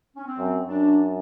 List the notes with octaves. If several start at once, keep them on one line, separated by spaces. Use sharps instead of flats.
C#4
C4
F#2
F#2 D4